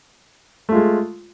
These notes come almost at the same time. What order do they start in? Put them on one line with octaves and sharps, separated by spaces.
A3 F4 G#3